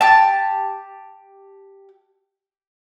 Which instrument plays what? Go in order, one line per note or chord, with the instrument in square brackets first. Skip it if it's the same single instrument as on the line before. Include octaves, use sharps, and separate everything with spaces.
[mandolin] G4 A5